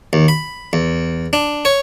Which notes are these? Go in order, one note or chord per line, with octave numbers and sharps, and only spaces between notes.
D#2
B5
E2
D4
C#5